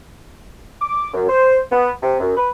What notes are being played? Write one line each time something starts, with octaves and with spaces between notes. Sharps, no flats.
D6
F#2
C5
B3
C3
F#2
B4